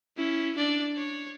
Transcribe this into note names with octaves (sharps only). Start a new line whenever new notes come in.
C#4 E4
D4 D5
C#5